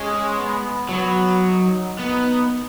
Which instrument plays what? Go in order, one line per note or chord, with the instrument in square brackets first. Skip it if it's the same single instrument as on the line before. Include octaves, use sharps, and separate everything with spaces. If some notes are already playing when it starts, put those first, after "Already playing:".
Already playing: [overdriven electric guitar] G#3 [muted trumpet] C#4
[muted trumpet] B3
[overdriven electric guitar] F#3 [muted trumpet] B3
[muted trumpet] D#4
[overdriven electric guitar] B3 [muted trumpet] D#4